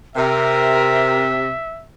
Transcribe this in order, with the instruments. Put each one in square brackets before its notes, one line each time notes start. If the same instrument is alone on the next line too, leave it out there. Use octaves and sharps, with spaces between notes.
[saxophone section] C3 [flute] A#4 [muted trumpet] E5